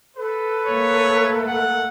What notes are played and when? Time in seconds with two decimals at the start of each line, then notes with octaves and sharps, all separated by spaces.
0.17 A4 B4
0.67 A3 A#3 C#5
1.48 F#5